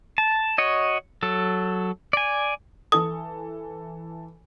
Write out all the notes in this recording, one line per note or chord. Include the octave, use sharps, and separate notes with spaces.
A5
F#4 C#5 D#5
F#3 A4
D5 G#5
E3 A4 D#6